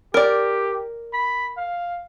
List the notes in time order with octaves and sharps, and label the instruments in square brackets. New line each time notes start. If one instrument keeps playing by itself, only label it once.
[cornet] G4 [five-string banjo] A#4 D5
[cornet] B5
F5